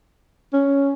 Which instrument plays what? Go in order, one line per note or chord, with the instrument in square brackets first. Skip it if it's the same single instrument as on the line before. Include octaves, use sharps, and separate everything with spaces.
[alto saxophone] C#4